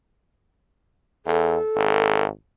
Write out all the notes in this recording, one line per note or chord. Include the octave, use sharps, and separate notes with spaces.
E2 A4
G#1